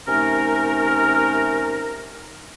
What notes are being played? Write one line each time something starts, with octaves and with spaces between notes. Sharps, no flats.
C3 A3 C#4 D#4 A#4